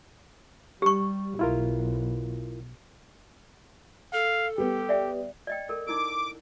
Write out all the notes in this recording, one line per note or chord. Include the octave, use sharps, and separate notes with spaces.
G3 G4 C#6
B1 E4 F4 A#4
A4 F5
G3 B3 G4
D5 E5 G5
D5 D#5 G5
A4 A#4 D5
D#4 E4 A#4 D6